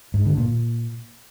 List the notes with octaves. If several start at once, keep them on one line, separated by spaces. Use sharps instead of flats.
G#2
D3
A#2